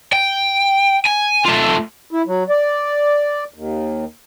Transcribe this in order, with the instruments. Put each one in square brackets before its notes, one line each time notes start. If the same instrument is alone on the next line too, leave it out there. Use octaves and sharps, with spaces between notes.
[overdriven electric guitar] G5
G#5
A3 F4
[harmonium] E4
F#3
D5
D#2